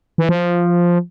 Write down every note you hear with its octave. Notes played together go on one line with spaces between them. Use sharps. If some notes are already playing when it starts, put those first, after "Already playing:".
E3
F3